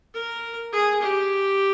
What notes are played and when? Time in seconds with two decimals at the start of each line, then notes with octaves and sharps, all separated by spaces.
0.14 A#4
0.72 G#4
1.02 G4